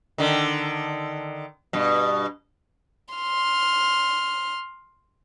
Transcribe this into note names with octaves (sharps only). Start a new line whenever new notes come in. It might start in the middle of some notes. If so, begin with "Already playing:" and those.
D3 D#3
G2 B2
C6 F6